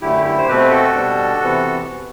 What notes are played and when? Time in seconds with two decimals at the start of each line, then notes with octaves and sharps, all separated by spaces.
0.01 F#2 D3 A3 E4 G4
0.24 E4 G4
0.38 C5
0.48 B2 A3 C4 G4 B4
0.71 F#4 A4
0.95 B2 G3 D4
1.41 C3 E3 B3